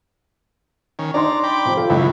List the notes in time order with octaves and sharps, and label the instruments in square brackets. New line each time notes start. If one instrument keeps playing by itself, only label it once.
[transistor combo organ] D#3 C#4
[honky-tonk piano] D4 D#4 C6 [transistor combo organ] D5 A#5
[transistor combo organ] G5 B5 D6
[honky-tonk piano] C3 F3
F4 A4
[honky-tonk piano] C#2 E3 [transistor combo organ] F#2 E4